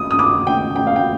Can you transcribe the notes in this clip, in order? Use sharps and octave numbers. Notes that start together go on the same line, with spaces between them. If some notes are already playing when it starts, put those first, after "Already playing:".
Already playing: D#6
D#6
D6
G5
G5
F5
G5